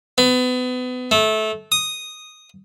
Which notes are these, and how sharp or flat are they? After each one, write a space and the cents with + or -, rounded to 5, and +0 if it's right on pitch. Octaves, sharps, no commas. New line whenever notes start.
B3 +30
A3 -20
D#6 -5